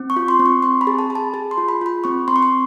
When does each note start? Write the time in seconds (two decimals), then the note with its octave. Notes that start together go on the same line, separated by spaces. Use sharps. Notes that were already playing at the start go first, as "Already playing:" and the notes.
Already playing: C4
0.10 C#6
0.16 F4
0.28 C6
0.40 C4
0.46 C#6
0.62 C4 C6
0.81 B5
0.87 G#4
0.99 A5
1.10 G#4
1.15 A5
1.34 G#4
1.51 C6
1.58 F4
1.69 B5
1.81 F4 B5
2.04 C4 C#6
2.28 C4 C6
2.36 C#6
2.43 C6